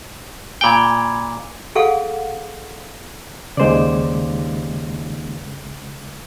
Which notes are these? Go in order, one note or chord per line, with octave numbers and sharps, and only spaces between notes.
A#2 G5 G#5 B5 G#6
G#4 A4 F5 F#5
D#2 C#3 G#3 C5 D5